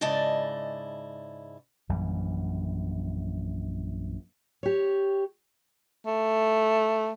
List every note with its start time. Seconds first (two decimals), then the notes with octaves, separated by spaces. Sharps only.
0.01 G#2 C#3 E4 D5 D#5 A5
1.89 A#1 F#2 E3 G3
4.63 G4 C#5
6.07 A3